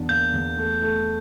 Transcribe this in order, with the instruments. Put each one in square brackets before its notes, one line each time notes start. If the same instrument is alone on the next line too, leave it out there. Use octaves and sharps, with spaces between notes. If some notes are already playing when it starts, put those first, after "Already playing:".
Already playing: [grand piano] E2 D4
[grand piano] A#3 [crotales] G6
[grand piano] E2
A3
A3